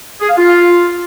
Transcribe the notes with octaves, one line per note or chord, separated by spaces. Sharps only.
G#4
F5
F4